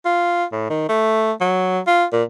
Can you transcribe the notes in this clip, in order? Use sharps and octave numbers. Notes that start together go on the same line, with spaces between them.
F4
A2
D#3
A3
F#3
F4
A#2